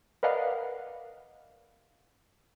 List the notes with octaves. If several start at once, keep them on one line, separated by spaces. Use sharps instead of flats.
A#4 B4 D5 D#5 F5 F#5